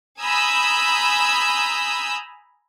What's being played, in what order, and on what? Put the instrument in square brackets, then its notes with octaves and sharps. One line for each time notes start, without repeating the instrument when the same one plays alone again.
[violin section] G#5 A#5 B5 D#6 E6 G6